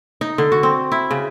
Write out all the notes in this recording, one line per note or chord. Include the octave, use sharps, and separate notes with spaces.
D#4
D3
F#4
C4
E4
C#3